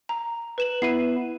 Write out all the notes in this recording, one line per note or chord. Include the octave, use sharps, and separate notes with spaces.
A#5
B4 E7 F#7
B3 E4 C7 D#7